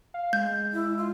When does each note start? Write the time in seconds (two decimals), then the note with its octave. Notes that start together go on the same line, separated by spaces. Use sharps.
0.14 F5
0.33 G#3 G6
0.73 E4
0.97 F4